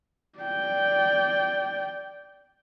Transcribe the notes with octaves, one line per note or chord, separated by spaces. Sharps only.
D5 G5